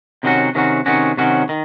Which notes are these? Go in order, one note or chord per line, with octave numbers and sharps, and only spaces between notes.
C3 D#3 F#3 C#4 F#4
C3 D#3 F#3 C#4 F#4
C3 D#3 F#3 C#4 F#4
C3 D#3 F#3 C#4 F#4
D#3